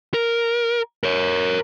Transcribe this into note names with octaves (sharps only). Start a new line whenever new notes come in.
A#4
A#4 C#5